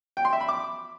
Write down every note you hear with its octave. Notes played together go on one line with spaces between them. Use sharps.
G5
C6
E5
B5
D6